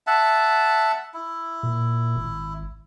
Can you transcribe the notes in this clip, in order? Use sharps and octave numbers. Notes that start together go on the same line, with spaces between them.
E5 F#5 A5
E4
A#2
G#1